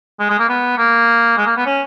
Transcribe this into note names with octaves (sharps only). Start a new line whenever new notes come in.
G#3
G#3
A#3
B3
A#3
G#3
A#3
B3
C#4